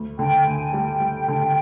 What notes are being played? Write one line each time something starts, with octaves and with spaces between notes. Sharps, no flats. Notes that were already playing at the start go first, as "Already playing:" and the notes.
Already playing: D2
D3 G5
D2 G#5
G3 G5
G3
D3